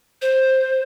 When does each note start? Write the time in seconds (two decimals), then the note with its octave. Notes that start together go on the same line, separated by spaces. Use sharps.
0.22 C5